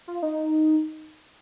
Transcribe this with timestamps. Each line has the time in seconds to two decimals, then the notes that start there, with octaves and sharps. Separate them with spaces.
0.08 F4
0.22 D#4